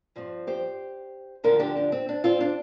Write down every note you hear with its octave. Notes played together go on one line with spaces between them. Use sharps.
G2 F3 C4
G4 C5
D2 D3 F3 F4 A#4
D4 G4
D4
C4
D4
C4 F4
D4